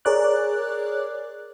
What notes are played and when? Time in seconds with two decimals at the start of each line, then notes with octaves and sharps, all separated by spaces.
0.05 G#4 A#4 C#5 D5 D6 F#6